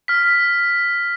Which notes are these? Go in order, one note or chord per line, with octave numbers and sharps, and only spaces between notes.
F6 B6